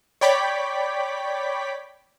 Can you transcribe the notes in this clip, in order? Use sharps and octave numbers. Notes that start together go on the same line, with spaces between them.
C#5 D5 G5 B5 D6 B6